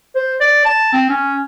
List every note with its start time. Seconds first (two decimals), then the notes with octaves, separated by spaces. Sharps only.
0.15 C5
0.41 D5
0.65 A5
0.93 C4
1.09 C#4